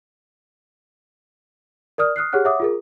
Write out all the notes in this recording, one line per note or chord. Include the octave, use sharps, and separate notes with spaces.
A#4 D5 D#6 F6
D#6 F6 F#6 C7
G4 G#4 C#5 F#5 F6 F#6
C#5 E5 F#5 D6 D#6
F4 G#4 A#4